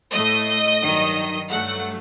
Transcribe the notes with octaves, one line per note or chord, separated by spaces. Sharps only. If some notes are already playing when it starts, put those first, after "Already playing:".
A2 A3 D#5
G2 D#3 F#3
G2 F#3 A3 F#5